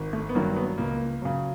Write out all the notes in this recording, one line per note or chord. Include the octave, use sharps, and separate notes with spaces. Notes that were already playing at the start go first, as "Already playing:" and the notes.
Already playing: G#1
A3
B3
G2 D#3 F#3 A#3
B3
C#2 A#3
C#3 F#3